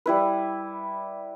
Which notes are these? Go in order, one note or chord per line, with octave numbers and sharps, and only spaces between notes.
G3 E4 B4